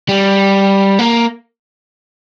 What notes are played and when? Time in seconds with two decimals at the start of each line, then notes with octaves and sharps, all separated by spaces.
0.09 G3
0.99 A#3